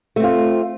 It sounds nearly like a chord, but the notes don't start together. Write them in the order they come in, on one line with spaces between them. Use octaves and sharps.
A3 C4 F4